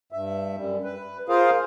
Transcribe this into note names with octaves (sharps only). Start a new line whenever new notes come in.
G2 E5
F#2 G3
B4
F4 G#4 A#4 C5 F5